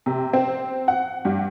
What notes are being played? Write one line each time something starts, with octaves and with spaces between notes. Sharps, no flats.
C3
C4
F#5
G2